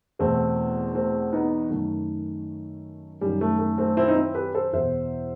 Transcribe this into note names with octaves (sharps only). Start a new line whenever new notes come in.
E2 B2 A3 C4
A3 C4
B3 D#4
F#2 D#3 A3
F#2 D#3 G3
A3
A3
A3 C4
C4 E4
D#4
C4 E4
G4 B4
A4 C5
E2 B2 C5 E5